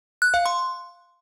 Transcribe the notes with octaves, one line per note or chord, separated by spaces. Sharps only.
F#6
F5
C6